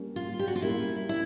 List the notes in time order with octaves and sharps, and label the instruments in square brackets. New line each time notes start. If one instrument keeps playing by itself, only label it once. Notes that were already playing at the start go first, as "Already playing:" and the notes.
Already playing: [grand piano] G3 A#3 C#4
[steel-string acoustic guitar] F4
G4
F#4
F4
[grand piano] G3 A#3 C#4 [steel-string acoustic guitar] E4
[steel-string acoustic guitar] E4